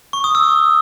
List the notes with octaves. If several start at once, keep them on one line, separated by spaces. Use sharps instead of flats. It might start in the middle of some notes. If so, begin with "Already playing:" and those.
C#6
D#6
E6